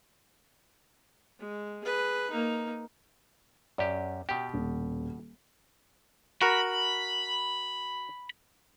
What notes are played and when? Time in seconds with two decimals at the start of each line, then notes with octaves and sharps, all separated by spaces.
1.39 G#3
1.84 G#4 B4
2.30 A#3 D#4
3.78 F#2 G4 D5
4.29 B2 G4 G5
4.54 D#1
6.42 F#4 A#4 B5